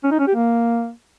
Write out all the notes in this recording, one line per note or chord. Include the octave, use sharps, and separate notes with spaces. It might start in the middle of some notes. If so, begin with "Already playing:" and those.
C#4
D#4
C#4
G4
A#3